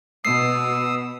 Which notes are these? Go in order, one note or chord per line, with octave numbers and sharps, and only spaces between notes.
B2 D#6 E6 C7